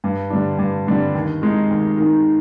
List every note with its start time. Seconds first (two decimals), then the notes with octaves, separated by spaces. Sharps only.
0.04 G2
0.30 D3 G3 D4
0.58 G2
0.87 D3 G3 D4
1.15 D#2
1.42 D#3 G#3 D#4
1.71 D#2
1.97 D#3 G#3 D#4